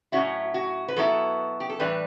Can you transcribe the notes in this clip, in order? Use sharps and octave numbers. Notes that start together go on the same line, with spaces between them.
A2 F#3 C#4 E4 F#4
F#4
B4
B2 F#3 B3 E4 A4
G4
A4
A2 E3 G3 D4 B4